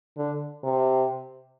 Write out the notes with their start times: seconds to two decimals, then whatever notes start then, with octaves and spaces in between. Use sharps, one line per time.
0.17 D3
0.63 C3